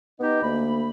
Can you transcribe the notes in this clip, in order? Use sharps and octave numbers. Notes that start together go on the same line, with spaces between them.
B3 D#4 G4 D#5
D2 A#3 B5